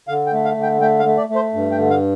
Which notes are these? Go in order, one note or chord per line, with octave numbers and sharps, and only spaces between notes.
D3 F5
G5
A3
F5
D3
G5
A3 G5
F5
A3
D5
A3
C5
G2
G5
D3
F5